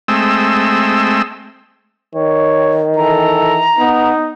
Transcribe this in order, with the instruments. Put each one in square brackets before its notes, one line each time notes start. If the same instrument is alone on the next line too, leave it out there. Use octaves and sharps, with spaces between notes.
[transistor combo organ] G#3 A3 C4 E6
[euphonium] D#3 [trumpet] C#5
[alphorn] E3 [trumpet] A4 [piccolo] A#5
[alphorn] B3 [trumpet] D#4